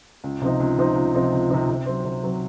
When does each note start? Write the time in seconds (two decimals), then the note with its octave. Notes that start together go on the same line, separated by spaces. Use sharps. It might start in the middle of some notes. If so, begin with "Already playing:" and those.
0.24 C#2
0.42 C3 F3 C4 D#4
0.60 C#2
0.78 C3 F3 C4 D#4
0.96 C#2
1.14 C3 F3 C4 D#4
1.32 C#2
1.50 C3 F3 C4 D#4
1.69 C3
1.86 F#3 C4
2.05 C3
2.23 F#3 C4